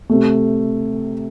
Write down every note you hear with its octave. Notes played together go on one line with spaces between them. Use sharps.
C3 A3